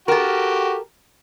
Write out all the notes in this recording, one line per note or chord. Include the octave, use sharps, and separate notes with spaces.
F#4 G4 A4 A#4 G5